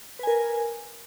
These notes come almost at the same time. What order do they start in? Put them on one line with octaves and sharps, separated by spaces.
B4 G#5 A#4